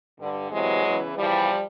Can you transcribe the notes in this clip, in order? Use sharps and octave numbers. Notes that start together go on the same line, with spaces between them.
G2 D3
E2 C3 E3 F#3 G#3
E2 C#3 E3
E2 C#3 E3 F3 G3